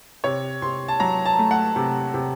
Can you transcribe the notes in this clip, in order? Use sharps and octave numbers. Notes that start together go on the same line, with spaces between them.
C3 C#5
C3 C6
A5
F#3 A#5
A5
A3
F#5
C3
C3